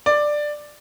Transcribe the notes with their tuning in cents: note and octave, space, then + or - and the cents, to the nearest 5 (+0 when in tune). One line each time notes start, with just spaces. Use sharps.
D5 +10